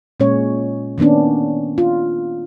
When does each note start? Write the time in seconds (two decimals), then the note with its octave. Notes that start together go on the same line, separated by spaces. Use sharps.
0.20 A#2 G#3 C#4 C#5
0.98 D#3 A#3 B3 C#4 D4
1.78 F4